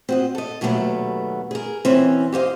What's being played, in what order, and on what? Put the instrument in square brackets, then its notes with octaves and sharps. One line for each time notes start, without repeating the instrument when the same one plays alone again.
[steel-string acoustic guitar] C4 F#4 D#5
A4 D#5
D#2 B2 F#3 G3 A3 B3
G#4 A#4
B2 E3 C4 C#4
G4 C5 D#5 F5